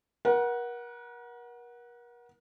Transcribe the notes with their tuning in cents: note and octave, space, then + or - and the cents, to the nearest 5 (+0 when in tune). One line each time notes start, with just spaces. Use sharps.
A#4 +40 F#5 +0